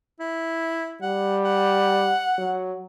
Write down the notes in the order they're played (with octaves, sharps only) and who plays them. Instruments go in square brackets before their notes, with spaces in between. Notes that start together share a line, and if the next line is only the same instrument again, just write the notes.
[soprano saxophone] E4
[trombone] G3 [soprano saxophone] F#5
[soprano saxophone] F#5
[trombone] F#3